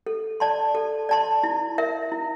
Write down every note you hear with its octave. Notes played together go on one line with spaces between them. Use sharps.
A4
D5 A5 C6
A4
D5 A5 C6
E4
A#4 E5
E4